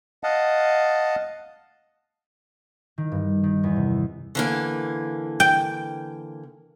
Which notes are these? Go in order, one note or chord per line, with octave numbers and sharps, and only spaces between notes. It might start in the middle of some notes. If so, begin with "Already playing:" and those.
D#5 F5 F#5 A5
D#3
G2
D#3
E2
C3
D3 E3 A#3
G5